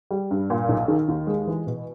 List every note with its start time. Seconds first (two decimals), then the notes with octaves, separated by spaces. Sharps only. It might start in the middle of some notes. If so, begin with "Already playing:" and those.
0.11 G3
0.31 G2
0.50 A#2
0.69 B1
0.88 D#3
1.08 D#2
1.27 G#3
1.47 E3
1.67 B2